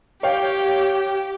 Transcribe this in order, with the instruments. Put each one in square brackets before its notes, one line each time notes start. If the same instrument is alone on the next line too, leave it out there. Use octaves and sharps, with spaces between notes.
[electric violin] G4 [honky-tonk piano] C#5 F5 G5